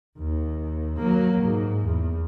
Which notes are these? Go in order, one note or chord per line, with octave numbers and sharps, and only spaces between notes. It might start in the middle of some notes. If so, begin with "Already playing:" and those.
D#2
F#3 A#3
G#2
E2